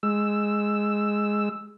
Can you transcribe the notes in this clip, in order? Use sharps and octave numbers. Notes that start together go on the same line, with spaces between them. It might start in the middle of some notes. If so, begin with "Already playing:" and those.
G#3 E6